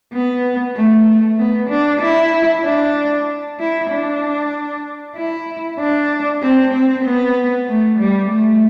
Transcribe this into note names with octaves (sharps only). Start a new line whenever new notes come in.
B3
A3
B3
D4
E4
D4
E4
D4
E4
D4
C4
C4
B3
A3
G3
A3